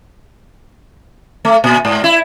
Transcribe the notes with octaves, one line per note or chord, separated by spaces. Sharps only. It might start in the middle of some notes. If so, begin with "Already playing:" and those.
A3
A#2
G#2
E4